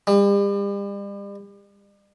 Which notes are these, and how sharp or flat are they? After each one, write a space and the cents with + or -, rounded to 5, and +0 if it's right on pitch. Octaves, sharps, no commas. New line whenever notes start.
G3 +40